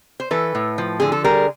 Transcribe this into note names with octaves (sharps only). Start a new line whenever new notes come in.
C5
E3 A4 B4
A2
F3
D3 G#4
A4
G3 G#4 A#4